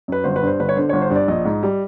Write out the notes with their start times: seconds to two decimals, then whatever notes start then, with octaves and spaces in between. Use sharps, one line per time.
0.08 F#2 B4
0.24 G1 C5
0.36 B4
0.42 G2 C5
0.59 G1 B4
0.69 C#5
0.76 D3 C5
0.89 G1 C#5
1.02 C5
1.10 G2
1.16 D5
1.28 A#1 D#5
1.45 G#2
1.63 G3